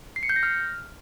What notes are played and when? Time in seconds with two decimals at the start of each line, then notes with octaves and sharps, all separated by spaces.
0.16 C7
0.23 C#7
0.29 G6
0.36 A#6
0.43 F6